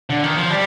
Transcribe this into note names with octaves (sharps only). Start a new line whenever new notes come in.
D3
D#3
F3
G3